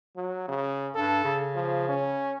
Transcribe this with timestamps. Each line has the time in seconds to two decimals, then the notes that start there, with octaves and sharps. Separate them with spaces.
0.16 F#3
0.48 C#3
0.95 G2 A4
1.24 C#3
1.56 F3
1.89 C#4